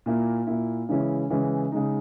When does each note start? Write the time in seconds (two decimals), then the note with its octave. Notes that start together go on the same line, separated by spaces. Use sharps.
0.06 A#2 A#3 E4
0.47 A#2 A#3 E4
0.89 C#3 E3 G#3 C#4 E4
1.30 C#3 E3 G#3 C#4 E4
1.72 C#3 G#3 D#4